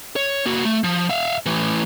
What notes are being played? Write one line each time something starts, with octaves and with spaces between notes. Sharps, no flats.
C#5
A#3 F#4
A3
F3
E5 F5
A2 E3